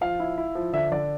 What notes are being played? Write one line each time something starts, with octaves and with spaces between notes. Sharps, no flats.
F3 F5
E4
E4
F3
D3 E5
D3 D5